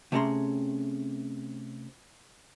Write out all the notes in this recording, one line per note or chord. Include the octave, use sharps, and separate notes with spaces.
C3 A3 C#4 G#4 A#5 C6